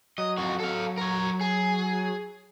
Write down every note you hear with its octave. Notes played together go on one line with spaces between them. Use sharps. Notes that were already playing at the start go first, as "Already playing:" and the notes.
F#3 D#5
F2 F#4
A4 F5
A#4 C#5
G#4